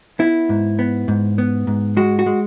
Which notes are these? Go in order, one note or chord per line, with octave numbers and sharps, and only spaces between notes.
B3 E4
G#2
B3
G#2
B3
G#2
G#3 F#4
F#4
G#3